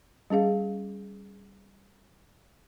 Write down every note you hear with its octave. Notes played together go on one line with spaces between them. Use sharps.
G3 C#4 G#4 F5